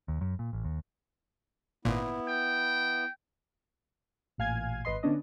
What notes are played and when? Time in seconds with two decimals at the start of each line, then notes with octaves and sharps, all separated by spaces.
0.08 D#2
0.21 F#2
0.39 A#2
0.53 A1
0.65 D#2
1.85 G#1 A#2 B3 E4
2.28 G5
4.38 A1 A#2 F5 G#5 G#6
4.85 G#1 B4 D#5 C6
5.03 D3 B3 C#4 D4 D#5